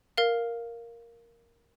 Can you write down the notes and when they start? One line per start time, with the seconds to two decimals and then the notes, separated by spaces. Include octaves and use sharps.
0.18 A#4 F5